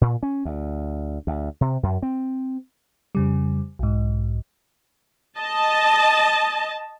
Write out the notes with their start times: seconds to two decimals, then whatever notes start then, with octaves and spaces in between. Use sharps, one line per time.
0.01 A#2
0.23 C#4
0.45 D2
1.27 D2
1.61 C3
1.83 F#2
2.02 C4
3.15 F2 C#3 G3
3.79 B1 G#2
5.37 D#5 A5